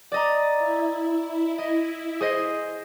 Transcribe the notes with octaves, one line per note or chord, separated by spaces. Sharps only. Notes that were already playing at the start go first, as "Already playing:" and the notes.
D5 D#5 A#5
E4
D#5
G#4 C5 D#5